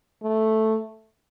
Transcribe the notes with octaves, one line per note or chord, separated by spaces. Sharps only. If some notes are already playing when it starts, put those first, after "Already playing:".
A3